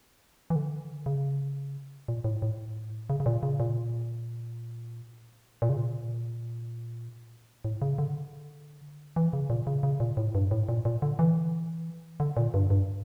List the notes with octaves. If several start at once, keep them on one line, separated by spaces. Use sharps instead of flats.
E3
D3
C#3
A#2
A2
A2
C#3
C#3
A#2
C#3
A#2
A#2
C#3
A#2
A2
C#3
D3
E3
C#3
A#2
C#3
C#3
A#2
A2
G2
A2
A#2
A#2
D3
E3
D3
A#2
G2
G2